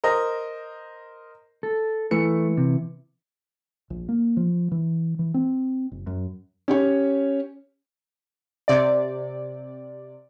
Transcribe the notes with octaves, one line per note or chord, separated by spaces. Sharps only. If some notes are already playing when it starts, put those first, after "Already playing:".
A#4 C5 D#5
A4
E3 A3 C#7
C3
A#1
A#3
F3
E3
E3
C4
F#1
F#2
C#4 G4 C#5
C3 D5